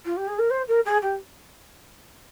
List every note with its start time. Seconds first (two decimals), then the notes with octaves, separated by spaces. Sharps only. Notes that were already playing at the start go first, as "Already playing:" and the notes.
0.05 F4
0.16 G4
0.28 G#4
0.38 A#4
0.50 C5
0.68 A#4
0.85 G#4
1.02 G4